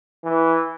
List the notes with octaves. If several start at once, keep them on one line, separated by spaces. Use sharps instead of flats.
E3